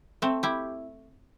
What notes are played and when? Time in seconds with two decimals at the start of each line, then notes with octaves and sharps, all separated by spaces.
0.22 A3 C4
0.43 E4 G4